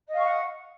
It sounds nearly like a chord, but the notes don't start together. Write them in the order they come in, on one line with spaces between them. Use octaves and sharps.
D#5 F5 C#6 F#5